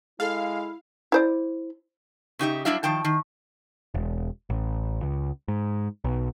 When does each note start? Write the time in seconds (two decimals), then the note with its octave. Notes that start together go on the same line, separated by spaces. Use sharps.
0.20 G#3 E4 G#4 A4 F5
1.12 E4 C5 D5
2.39 C#3 D#4 G4 E5
2.65 F#3 G3 D4 E4 E5 F5
2.83 D#3 F3 G5 A5
3.04 D#3
3.94 E1
4.50 A1
5.03 C#2
5.48 G#2
6.04 B1